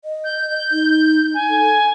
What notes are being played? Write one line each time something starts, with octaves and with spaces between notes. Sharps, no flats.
D#5
G6
D#4
G#5
A4